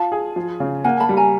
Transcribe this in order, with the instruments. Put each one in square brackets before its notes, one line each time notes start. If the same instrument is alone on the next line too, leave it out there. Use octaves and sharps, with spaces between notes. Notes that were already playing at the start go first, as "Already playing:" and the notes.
Already playing: [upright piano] F4 [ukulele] A5
[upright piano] G#4
F3
C#3
[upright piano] A#3 [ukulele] F#5 G#5
[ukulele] A5 B5
[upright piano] G3
[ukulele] G#5 A#5